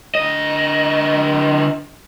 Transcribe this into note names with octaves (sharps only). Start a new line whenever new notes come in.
D3 D#5